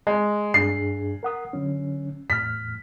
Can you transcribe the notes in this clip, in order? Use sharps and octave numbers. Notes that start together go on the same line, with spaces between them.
G#3
G2 D4 G#4 C7
A#4 F#5 D#6
D3 F#3 C#4
E2 A2 F6 B6